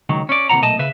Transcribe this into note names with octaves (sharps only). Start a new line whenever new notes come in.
C#2 D#3 F#3
C#4 D5
D#2 C3 E3 F#5 A#5
B1 A#2 A3 D#5 A5
C#3 B4 E5